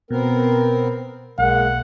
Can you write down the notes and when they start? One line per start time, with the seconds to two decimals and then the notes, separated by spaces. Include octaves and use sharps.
0.11 B2 B3 C4 A#4
1.39 B1 G#3 A#3 F#5